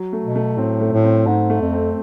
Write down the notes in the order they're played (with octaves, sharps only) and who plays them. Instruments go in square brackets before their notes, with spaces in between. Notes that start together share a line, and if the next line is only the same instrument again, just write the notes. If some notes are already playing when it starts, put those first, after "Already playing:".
Already playing: [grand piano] F#3
A3
[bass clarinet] B2
[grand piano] A3
[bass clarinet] A2 [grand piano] C4
[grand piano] A3
[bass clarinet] A2
[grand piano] C4
[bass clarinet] G#2 [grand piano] C4
[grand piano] A3
[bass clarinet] F2
[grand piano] C4